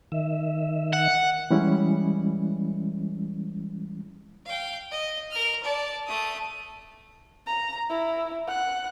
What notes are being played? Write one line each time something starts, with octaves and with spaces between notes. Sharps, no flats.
D#3 E5
F#5
E3 G3 G#3 C#4 E4
F5 G5
D#5
A#4 F6
D5 A5
A3 D#6
A#5
E4
F#5 F#6